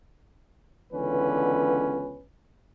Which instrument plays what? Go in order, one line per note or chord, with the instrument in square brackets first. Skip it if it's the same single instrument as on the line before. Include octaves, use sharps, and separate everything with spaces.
[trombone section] C#2 D3 E3 B3 C#4 B4